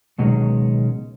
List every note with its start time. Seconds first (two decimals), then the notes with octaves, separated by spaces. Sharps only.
0.19 C#2 B2 D#3 F#3 G#3 C#4